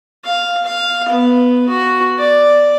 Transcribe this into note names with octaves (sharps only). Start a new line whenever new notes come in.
F5
F5
B3
F#4
D5